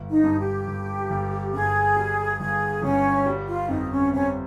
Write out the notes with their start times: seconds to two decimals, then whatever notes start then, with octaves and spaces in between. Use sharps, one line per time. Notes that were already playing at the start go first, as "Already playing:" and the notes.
Already playing: G1
0.09 D#4
0.24 G2
0.39 G4
0.67 G1
1.10 G1
1.53 G2 G#4
1.96 G3
2.39 G1 G#4
2.82 G1 C#4
3.26 G3
3.47 F4
3.68 F2 D#4
3.90 C#4
4.13 C3 C#4